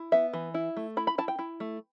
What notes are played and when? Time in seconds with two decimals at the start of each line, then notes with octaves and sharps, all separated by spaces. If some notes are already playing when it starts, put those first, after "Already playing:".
Already playing: E4
0.12 B3 E5
0.33 E3
0.54 E4
0.77 A3
0.97 E4 B5
1.07 B5
1.18 E4 A5
1.28 G5
1.39 E4
1.60 A3